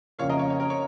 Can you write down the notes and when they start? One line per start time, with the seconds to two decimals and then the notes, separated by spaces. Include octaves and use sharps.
0.19 F2 C#3 A#3 C#5 F5
0.29 A#4 D#5
0.39 C#5
0.50 C#5
0.60 A#4
0.70 C#5